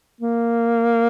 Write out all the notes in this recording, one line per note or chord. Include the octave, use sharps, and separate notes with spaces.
A#3